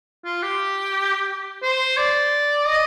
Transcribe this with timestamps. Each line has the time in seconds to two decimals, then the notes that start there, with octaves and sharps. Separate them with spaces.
0.25 F4
0.42 G4
1.62 C5
1.97 D5
2.66 D#5